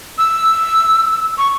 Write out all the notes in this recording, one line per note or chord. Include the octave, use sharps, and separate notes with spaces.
E6
C#6